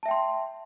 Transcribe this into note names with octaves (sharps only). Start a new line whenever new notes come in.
E5 G5 A5 C6